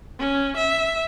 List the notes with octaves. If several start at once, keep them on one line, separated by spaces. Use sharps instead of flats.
C#4
E5